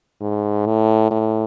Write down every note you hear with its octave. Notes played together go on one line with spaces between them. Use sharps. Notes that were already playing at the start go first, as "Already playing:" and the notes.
G#2
A2
A2